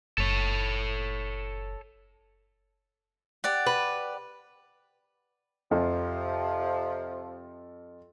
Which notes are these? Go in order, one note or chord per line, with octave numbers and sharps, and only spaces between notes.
F#1 A4 C#5
G4 D5 F#5
B4
F2 C3 F3